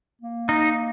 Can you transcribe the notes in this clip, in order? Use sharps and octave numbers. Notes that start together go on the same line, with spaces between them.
A#3
D#4